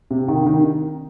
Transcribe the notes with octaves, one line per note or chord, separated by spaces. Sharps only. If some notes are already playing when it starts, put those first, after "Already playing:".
C3
D#3
D#3